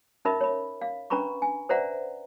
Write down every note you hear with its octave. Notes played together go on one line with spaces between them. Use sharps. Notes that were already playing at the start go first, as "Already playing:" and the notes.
C#4 D#4 A#4 D#5 E5 B5
C#5 B5
F5
C#4 D4 B4 A#5 B5 C#6
G#5
B4 C5 D5 E5 F#5 A#5